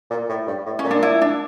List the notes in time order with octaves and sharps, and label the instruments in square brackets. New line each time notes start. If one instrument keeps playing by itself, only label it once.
[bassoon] A#2
A2
G2
A2
[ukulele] C#4
[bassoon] A#2
[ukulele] D4
E4
D4